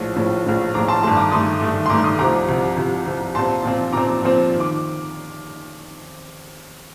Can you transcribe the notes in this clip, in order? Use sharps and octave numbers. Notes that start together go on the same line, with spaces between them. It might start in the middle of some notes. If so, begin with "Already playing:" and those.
Already playing: A#1 A2 F3
A#1 A2 F3
A#1 A2 F3
A#1 A2 F3 A#5 D6
A5 C6
G2 D#3 A3 A5 C6
A#5 D6
G2 D#3 A3 C6 D#6
G2 D#3 A3
C6
G2 D#3 A3 A#5 D6
C6 D#6
C2 C3 F3 A#5 D6
C2 C3 F3
C2 C3 F3
C2 C3 F3
A#2 F3 C4 A5 C6
A#2 F3 C4
A#2 F3 C4 A#5 D6
A#2 F3 C4
D#3
D6